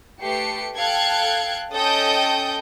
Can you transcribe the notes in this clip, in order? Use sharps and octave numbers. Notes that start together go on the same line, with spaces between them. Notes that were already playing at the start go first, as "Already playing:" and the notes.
A3 G4 B4 C7 C#7
A4 F5 G5 F#6 G#6
C#4 A4 D#5 G5 D#6 G6